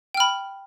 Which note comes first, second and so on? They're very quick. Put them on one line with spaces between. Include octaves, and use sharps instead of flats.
G5 F6 B5